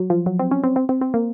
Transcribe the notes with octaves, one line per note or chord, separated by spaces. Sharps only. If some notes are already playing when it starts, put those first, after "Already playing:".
Already playing: F#3
F3
F#3
C4
C#4
C4
C4
C4
C4
A#3